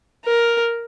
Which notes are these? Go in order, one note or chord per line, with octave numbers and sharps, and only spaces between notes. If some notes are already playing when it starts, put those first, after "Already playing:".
A#4